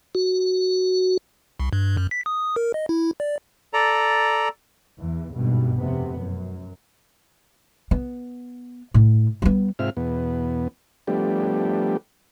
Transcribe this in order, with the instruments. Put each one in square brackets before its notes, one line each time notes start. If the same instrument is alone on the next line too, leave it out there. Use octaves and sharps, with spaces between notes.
[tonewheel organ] F#4
[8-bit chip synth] C2
G2
F#2
B6
D#6
A#4
D#5
E4
D5
[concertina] A4 D5 A#5
[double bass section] E2 E3
G#1 G2 B2
F1 C3 B3
F#2
[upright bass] B3
A2
G3 B3
[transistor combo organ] G#2 C3 C4 F4 E5 F6
E2 B2 B3
F3 G3 A3 B3 D4 G4